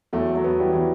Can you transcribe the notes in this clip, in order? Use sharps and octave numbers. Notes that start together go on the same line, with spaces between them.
E2 F#3 A3
F#3 A3
B3
E3 G3
E3 B3